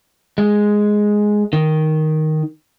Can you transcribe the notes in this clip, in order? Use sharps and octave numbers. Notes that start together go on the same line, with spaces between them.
G#3
D#3